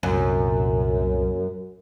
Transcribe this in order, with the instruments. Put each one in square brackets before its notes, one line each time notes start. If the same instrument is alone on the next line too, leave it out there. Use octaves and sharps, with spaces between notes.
[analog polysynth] C2 A#2 [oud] F#2